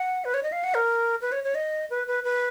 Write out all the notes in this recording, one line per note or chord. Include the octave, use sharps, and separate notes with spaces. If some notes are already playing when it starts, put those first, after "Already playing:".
Already playing: F#5
B4
C#5
D#5
F5
F#5
A#4
B4
C#5
C#5
D#5
B4
B4
B4